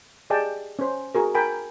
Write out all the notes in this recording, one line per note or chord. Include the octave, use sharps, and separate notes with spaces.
G4 G#4 D5 D#5 G5 A5
C#4 C5
F#4 G#4 A#4
A#4 G5 G#5 B5